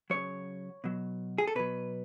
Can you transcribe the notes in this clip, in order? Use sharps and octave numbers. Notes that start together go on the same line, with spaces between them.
C#3 F#3 C#5
B2 F#3
G#4
A4
B2 F#3 B4